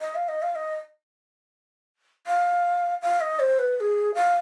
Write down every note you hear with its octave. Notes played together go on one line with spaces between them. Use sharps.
D#5
F5
D#5
F5
D#5
F5
F5
D#5
C5
B4
B4
G#4
F5